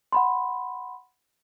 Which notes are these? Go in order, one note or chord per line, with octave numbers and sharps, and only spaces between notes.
F#5 B5 C6